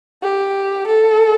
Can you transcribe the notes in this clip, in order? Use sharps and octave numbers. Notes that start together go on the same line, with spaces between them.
G4
A4